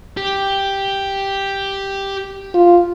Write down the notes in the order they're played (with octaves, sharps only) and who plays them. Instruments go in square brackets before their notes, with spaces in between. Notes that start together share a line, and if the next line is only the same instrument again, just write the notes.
[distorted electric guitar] G4
[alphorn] F4